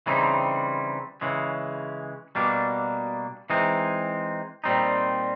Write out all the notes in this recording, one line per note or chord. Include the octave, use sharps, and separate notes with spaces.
C#3 E3 G3 C4 D#4
C#3 E3 G#3
B2 G3 A#3 D4
E3 G#3 C4 D#4
A#2 G3 C4 D#4